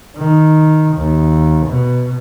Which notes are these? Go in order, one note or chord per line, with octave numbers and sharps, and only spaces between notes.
D#3
D#2
B2